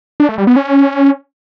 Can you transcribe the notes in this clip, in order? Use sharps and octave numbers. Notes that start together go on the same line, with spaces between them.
D4
A3
G3
B3
C#4